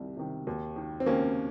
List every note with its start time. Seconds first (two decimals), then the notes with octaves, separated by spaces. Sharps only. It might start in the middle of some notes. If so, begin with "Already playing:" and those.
Already playing: C2 C3 D#3
0.17 C3 D#3
0.47 D#2
0.76 D#3
1.00 C4
1.06 D#2 A#3 C#4